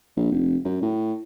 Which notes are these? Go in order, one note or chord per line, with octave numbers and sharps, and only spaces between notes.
A#1
F1
F#2
A2